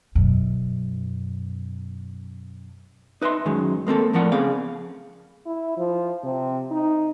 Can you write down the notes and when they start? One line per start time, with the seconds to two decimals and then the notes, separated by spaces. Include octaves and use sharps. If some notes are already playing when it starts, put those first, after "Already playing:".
0.15 F#2 B2
3.22 D#4 B4 D#5 E5 C6
3.46 F#2 D#3 F#3 G#3
3.87 G#3 A#3 C4 A4
4.13 A2 F3 A#4 D5 F#5
4.31 C#3 B3 C4 G#4 F5
5.46 E4
5.78 F3
6.24 C3
6.71 D#4